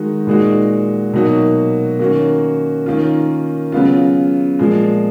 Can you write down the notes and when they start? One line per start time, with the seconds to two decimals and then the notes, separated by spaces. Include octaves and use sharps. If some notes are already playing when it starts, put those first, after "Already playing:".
Already playing: D#3 G#3 D#4 F#4
0.27 A#2 G#3 D#4 F#4
1.13 B2 F#3 A#3 D#4 F#4
1.99 D#3 A#3 C#4 F#4
2.86 D#3 A#3 C#4 F4
3.72 C#3 F#3 B3 F4
4.59 A#2 F3 G#3